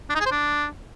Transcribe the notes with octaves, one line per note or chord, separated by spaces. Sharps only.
D4
D#4
G#4
C5
D4